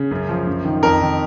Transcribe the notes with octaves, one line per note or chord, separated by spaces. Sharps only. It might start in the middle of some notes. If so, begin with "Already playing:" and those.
Already playing: C#3
F#2
F3
F#2
D#3
F2 A#4
D#3